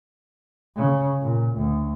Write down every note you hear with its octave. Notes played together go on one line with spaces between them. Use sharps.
C#3
A#2
D2